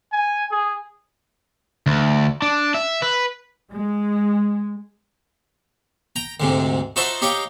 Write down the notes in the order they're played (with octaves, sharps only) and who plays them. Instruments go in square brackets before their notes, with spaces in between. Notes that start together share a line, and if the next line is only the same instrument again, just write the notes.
[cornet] G#5
G#4
[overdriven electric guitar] D2
D4
E5
B4
[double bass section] G#3
[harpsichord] G5 A#5
D2 G#2 C3
D#4 F4 F#4 C5 E5 A5
D#4 G4 C#5 F5 G5